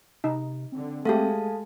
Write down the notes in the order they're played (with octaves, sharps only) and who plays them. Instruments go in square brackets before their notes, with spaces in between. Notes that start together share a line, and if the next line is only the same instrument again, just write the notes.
[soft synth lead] C3 [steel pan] D#4
[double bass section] D3 [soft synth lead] C4
[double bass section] G#3 [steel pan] A3 G4 [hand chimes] A4 F5 A5